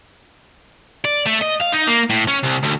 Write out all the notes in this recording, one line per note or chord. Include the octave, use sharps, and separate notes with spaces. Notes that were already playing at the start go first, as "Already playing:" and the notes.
D5
A3
D#5
F5
D#4
A#3
A2
C#4
C2
D2